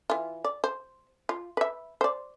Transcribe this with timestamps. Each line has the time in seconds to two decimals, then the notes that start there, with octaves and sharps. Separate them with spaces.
0.10 E3 F4
0.44 D5
0.64 C5
1.29 F4
1.57 B4 E5
2.01 C5 D5